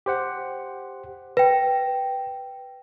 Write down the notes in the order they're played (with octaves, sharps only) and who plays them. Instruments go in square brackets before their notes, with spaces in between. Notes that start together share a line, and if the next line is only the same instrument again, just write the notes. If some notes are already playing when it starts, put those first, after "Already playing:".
[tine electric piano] G4 C5 F#5
[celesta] B4 G5 [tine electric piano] A#6